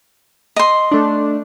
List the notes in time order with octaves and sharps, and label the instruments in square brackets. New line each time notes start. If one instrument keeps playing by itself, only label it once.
[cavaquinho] D#5 C6
[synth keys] A3 D4